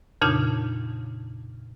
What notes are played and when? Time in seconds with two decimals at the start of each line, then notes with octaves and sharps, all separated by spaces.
0.21 F2 A#2 C#3 D4 D#4 G6